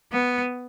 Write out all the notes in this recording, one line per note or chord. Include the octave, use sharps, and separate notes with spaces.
B3